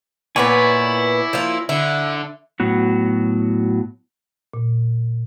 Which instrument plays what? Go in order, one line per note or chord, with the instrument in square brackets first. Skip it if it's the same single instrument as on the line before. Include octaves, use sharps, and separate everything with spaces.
[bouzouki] A#2 B3 B4 [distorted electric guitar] E4 [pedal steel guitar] C#5 D5 G#5
[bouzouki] F3 A#3 F4
[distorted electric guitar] D3 [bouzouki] E4
[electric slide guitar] A2 F#3 B3 F#4
[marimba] A#2